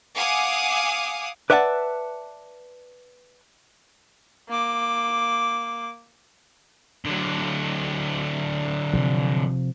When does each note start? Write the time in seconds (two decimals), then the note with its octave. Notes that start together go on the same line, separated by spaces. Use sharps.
0.16 F5 F#5 G#5 D6 D#6
1.50 B4 D5 E5 F#5 G5 A5
4.49 A#3 D6
7.05 D3 F#3
8.93 C3 F3